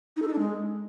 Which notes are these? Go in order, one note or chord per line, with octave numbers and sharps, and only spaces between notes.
D#4
A4
D#4
D4
G#3